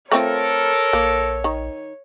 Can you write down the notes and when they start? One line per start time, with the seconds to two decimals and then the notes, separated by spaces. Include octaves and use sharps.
0.12 A3 C4 F4 A4 A#4 C#5
0.93 A#1 A#3
1.44 D#3